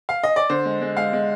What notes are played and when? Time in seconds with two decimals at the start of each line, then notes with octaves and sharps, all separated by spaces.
0.09 F5
0.23 D#5
0.36 D5
0.49 D3 C5
0.65 G#3
0.82 G#3
0.97 G#3 F5
1.13 G#3